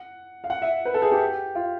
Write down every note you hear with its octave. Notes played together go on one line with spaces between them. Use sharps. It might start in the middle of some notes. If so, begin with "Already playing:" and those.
Already playing: F#5
F5
F#5
E5
B4
A4
G#4
G4
F4